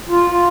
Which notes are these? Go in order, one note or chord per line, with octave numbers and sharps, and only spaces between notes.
F4
F4